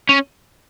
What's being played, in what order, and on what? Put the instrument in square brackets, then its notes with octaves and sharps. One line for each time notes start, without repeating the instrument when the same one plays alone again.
[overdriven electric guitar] C#4